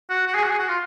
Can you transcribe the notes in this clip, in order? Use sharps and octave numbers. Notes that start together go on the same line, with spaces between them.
F#4
F#4
G#4
F#4
G#4
F#4
F4